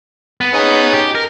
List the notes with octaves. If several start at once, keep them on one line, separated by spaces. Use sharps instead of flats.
B3
C#4 D#4 G#4
G4
A#4